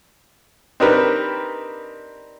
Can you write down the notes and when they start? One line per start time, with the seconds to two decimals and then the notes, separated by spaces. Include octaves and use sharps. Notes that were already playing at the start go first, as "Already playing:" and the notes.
0.80 C4 D4 D#4 G4 A#4 B4